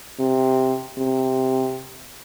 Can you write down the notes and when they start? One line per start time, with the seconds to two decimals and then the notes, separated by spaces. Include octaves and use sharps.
0.19 C3
0.98 C3